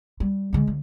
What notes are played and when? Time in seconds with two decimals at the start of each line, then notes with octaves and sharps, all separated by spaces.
0.20 G3
0.53 D3 G#3
0.67 D2